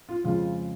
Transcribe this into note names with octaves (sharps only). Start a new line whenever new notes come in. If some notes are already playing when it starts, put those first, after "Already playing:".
F4
F2 C#3 G#3 F4